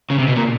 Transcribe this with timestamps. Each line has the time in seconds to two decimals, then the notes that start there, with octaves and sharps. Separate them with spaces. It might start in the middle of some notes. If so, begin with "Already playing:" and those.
0.10 C#3
0.18 C3
0.28 B2
0.36 A#2